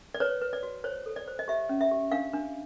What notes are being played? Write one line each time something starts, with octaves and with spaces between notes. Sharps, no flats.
D5
B4 C#5
B4
D5
F#4
C5 C#5
A4
D5
C5
D#5
G4 E5
C#4
E5
G4
D4 F5
D4